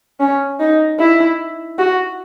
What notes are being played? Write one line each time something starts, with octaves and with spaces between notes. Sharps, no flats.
C#4
D#4
E4
F#4